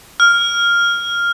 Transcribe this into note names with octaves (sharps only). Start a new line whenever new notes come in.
F6